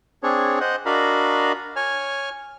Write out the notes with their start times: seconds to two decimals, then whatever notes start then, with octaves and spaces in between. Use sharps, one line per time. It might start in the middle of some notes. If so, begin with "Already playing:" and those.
0.23 C4 D4 G#4 C#5
0.60 C5 D#5 F#5
0.86 D4 F#4 A#4 D#5 F5 B5
1.76 C#5 G#5 F6